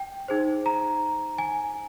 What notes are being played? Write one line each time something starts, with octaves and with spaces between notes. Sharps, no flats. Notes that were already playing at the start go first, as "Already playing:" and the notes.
Already playing: G5
D#4 G#4 C5
A#5
G#5